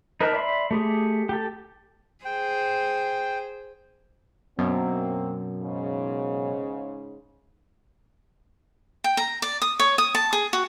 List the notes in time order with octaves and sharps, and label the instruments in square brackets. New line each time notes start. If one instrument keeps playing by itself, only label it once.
[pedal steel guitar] D#4 A#4 B4 A5
D5 E5 B5 C6
A3 G4 G#4
G4 A4
[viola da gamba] G#4 C5 [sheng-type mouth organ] G5
[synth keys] F#2 B2 [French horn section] F#3 A#3 C4
[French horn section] G#2 C#3
[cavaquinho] G5
A#5
D5
D#6
C#5
D#6
A5
G#4
F#4